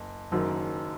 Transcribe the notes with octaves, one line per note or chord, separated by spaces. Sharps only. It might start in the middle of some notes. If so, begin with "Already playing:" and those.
Already playing: F#1
F#1 F#2 D#3 F#3